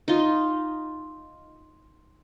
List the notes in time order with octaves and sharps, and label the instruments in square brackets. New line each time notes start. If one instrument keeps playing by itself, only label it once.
[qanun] D#4 F4